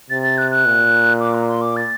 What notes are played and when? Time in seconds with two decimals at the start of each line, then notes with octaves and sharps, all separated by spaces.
0.10 C3 A6
0.23 A6
0.38 F#6
0.51 F#6
0.66 A#2
1.20 D6
1.35 A#5
1.49 C6
1.62 D6
1.76 A6